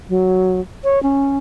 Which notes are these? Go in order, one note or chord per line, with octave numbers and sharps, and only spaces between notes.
F#3
C#5
C#4